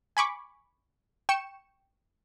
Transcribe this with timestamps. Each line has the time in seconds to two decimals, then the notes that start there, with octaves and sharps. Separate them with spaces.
0.17 G#5 B5 C#6 D6
1.29 G5 C#6 C#7 E7